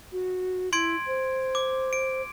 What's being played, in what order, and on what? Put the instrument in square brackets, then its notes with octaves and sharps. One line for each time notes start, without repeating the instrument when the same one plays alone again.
[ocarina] F#4
[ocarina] E4 [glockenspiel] C6 G#6 D7
[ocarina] C5
[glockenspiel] D6
D7